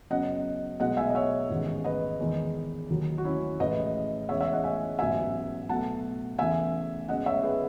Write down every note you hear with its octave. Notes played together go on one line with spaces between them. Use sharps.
F#2 C#3 F#3 B3 D#5 F#5
B1 B2 G#3 B3 D#5 F#5
E5 G#5
D#5
C#5 E5
A1 G#2 D#3 G#3 B3
B4 D#5
E2 D#3 G#3
D#2 D#3 F#3
F#4
C#4 E4
A1 A2 G#3 B4 D#5
E2 C#3 G#3 C#5 E5
C#5 E5
D#5 F#5
E5 G#5
A1 G#2 F#3 B3 E5 G#5
B1 B2 A3 F#5 A5
E2 C#3 E3 A3 E5 G#5
F#2 C#3 G#3 B3 D#5 F#5
C#5 E5
G#4 B4